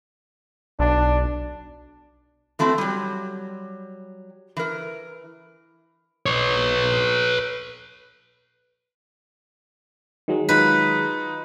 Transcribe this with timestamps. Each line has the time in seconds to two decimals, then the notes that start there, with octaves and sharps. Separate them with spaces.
0.79 B1 D4
2.59 E3 A3 C4 E4 F#4
2.78 F#3 G3
4.57 E3 A#4
6.26 B4 C#5
10.28 D#3 F#3 G#3
10.49 D#4 F4 B4